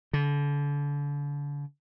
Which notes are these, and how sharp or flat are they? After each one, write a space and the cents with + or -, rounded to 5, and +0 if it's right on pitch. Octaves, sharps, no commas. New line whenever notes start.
D3 -35